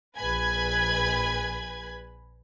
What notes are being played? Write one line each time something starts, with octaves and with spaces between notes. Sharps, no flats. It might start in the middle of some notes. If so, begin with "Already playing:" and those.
A#1 B4 G#5 B5 G#6